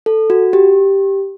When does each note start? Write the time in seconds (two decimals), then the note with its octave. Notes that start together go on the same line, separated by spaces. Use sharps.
0.06 A4
0.30 F#4
0.53 G4